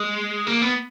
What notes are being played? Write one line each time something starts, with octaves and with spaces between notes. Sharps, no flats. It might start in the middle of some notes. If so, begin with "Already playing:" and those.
Already playing: G#3
A#3
B3